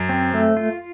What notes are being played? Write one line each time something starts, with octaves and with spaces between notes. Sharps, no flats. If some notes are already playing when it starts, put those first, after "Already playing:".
Already playing: F#2
C4
A3
F4